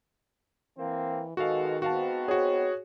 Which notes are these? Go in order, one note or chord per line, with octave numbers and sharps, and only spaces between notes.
E3 A#3 C4
B2 D#3 G#3 F#4 A4 F5
G#2 B3 C4 F#4 F5 A5
F#4 G#4 C#5